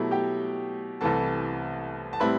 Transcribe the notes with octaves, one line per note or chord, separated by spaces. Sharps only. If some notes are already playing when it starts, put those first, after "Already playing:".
Already playing: B2 F#3 A3 E4 G4
G4 G5
C2 C3 E3 A3 A4 A5
A5
A2 G3 C4 E4 B4 B5